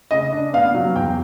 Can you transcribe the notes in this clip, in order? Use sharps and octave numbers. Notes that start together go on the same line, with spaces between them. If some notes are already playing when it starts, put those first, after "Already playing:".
C#3 D#5
D4
B3 F5
F#3
E2 G5